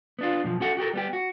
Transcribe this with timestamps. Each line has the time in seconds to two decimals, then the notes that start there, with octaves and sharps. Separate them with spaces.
0.19 B3 D4 F4
0.44 F#2 B2 F3
0.60 C#4 F#4 A4 F#5
0.77 F#4 G4 A4 A#4
0.93 G3 B3 G4
1.13 F#4